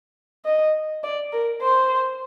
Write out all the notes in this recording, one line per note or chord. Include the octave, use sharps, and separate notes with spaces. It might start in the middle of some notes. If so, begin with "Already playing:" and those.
D#5
D5
A#4
C5